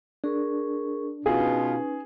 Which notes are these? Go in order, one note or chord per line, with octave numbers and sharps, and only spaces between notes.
D4 G#4 A#4 C#6
B2 C#4 D#4 F4 G#4 B4